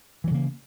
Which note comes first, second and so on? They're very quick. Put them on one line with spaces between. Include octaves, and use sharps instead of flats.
E3 F#3 C#3 A#3